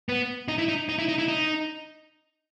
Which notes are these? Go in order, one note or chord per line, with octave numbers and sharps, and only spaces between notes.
B3
D#4
E4
D#4
D#4
E4
D#4
E4
D#4